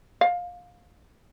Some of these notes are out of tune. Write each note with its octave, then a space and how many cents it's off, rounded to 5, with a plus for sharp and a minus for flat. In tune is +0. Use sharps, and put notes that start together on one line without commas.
F5 +20